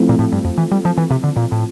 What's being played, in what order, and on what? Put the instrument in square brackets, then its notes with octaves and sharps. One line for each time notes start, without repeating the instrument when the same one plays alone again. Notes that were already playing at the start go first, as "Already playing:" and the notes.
Already playing: [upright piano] F3 A3 C4 E4 A4
[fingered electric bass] A#2
A2
G2
F2
E3
G3
F3
E3
C3
D3
A#2
A2